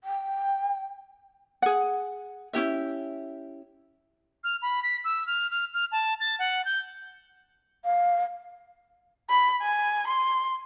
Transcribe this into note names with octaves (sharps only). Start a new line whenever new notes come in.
G5
G#4 F#5
C#4 E4 G4 E5
F6
B5
B6
E6
F6
F6
F6
A5
A6
F#5
G6
F5
B5
G#5
C6